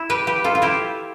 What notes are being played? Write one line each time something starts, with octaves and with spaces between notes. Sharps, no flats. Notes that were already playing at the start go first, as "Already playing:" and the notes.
Already playing: E4
G4 B4
G4 B4
F4 A4
F4
E4 G4